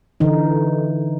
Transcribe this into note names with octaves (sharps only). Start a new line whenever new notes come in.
D3 E3 D#4